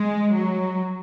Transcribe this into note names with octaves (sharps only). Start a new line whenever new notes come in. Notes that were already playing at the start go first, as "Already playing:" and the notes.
Already playing: G#3
F#3